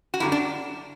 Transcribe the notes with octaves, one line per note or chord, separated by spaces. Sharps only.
F#4
F#2 D3 G3 E4
D4